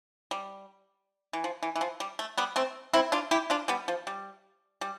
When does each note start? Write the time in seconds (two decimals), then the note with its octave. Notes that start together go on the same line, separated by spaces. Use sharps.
0.31 G3
1.33 E3
1.44 F3
1.63 E3
1.76 E3
1.81 F3
2.00 G3
2.19 A3
2.38 G3 B3
2.56 A3 C4
2.93 C4 E4
3.12 D4 F4
3.31 E4 G4
3.50 D4 F4
3.68 G3 B3
3.88 F3
4.07 G3
4.81 G3